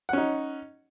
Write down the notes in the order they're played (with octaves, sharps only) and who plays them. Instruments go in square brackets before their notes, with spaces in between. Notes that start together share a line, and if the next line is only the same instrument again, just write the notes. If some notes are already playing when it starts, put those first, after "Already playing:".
[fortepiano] F#5
C#4
D#4